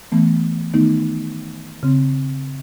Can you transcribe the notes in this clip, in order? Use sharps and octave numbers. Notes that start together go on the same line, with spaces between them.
E3 A3 B3
D#3 A3 B3 D#4
C#3 C4